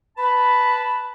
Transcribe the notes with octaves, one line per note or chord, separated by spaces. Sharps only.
B4 A5 B5